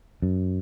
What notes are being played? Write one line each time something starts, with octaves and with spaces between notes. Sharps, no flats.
F#2